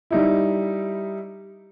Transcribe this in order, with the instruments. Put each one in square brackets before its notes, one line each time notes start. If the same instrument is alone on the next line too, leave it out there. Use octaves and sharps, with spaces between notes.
[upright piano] G3 D#4 E4